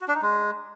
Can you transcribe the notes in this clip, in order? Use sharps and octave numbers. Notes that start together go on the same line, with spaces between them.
F#4
D4
D#4
G#3